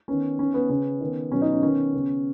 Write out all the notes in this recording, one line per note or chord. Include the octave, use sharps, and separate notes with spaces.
D#3 B3 C#4
D#3 B3 C#4
B3
C#3 B3 C#4
D#3 B3
B2 F#3 B3 C#4
D#4
C#4
D#3 B3 C#4
C#3 B3